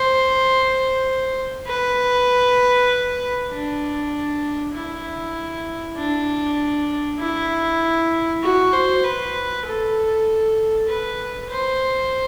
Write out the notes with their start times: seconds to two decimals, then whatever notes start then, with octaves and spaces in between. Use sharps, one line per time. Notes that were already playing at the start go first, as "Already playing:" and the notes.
Already playing: C5
1.67 B4
3.51 D4
4.74 E4
5.97 D4
7.20 E4
8.43 F#4
8.73 C5
9.04 B4
9.66 A4
10.88 B4
11.50 C5